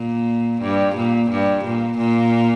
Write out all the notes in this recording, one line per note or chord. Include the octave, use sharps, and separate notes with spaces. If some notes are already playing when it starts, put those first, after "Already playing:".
Already playing: A#2
G2
A#2
G2
A#2
A#2